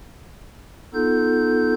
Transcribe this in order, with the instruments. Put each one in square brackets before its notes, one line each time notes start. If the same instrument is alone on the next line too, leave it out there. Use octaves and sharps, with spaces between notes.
[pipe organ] B3 D#4 F4 A4 G6